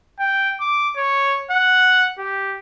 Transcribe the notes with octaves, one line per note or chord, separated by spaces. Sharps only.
G5
D6
C#5
F#5
G4